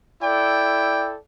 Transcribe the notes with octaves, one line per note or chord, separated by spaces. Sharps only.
E4 A4 D5 G5